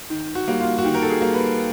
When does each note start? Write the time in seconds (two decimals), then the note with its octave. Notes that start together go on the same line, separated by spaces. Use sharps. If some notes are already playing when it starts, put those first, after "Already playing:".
0.10 D#3
0.35 F#4
0.48 G3 A#3
0.60 F4
0.78 F#4
0.85 D#3 G4
0.95 A#4
1.03 A4
1.10 G#4
1.22 G3 A#3
1.34 B4